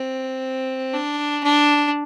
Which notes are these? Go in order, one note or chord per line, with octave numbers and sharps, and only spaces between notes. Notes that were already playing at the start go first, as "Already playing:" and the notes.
Already playing: C4
D4
D4